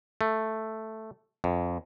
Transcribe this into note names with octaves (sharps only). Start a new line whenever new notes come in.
A3
F2